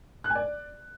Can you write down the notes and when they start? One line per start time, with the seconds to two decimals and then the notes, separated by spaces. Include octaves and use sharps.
0.24 F#6
0.30 G#5
0.35 D5